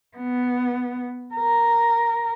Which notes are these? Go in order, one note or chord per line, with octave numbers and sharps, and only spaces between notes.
B3
A#4